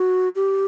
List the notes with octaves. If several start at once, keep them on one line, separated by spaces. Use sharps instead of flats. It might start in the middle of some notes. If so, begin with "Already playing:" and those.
Already playing: F#4
G4